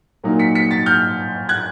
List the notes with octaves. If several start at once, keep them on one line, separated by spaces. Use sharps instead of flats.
A#2 F#3 A#3 D#4
B6 C#7
B6 C#7
A6 B6
F6 G6
F#6 G#6